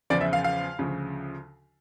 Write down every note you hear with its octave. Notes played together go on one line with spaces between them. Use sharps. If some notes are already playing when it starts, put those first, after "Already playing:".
E2 C#3 F3 D5
E5
F5
F5
D2 C#3 F3